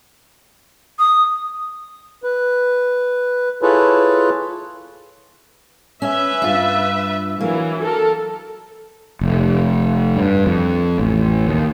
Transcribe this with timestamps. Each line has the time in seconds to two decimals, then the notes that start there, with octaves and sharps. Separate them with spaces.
0.99 D#6
2.23 B4
3.62 E4 F4 G#4 A4 B4 C#5
6.02 C#4 B4 E5
6.42 G2 F4
7.41 E3 F#3 A#3
7.82 A4 A#4
9.21 F1
10.17 G2
10.47 F2
10.99 A1
11.48 D#2